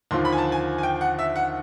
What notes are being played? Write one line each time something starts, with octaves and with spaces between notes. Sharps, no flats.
D#2 D3 F3 C6
B5
G#5
A5
G#5
G#5
G5
F#5
E5
F#5